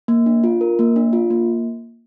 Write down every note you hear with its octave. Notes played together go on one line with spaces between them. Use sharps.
A#3
D4
F4
A#4
A#3
D4
F4
A#3